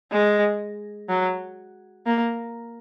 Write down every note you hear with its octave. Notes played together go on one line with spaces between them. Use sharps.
G#3
F#3
A#3